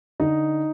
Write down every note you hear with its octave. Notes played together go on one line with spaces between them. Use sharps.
D3 D#4 D#5